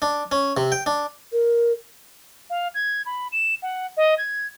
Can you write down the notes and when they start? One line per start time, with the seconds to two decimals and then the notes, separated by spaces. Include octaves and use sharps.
0.02 D4
0.32 C#4
0.57 C3
0.72 G5
0.86 D4
1.32 A#4
2.50 F5
2.74 G#6
3.06 B5
3.32 E7
3.62 F#5
3.97 D#5
4.18 G#6